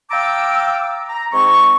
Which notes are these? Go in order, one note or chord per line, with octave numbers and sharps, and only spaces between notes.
F5 G5 A5 A#5 D6 E6
A#5
G#2 G#3 C4 C#6